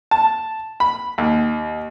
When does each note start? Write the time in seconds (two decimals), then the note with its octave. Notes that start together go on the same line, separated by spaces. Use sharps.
0.11 A5
0.80 B5
1.18 D#2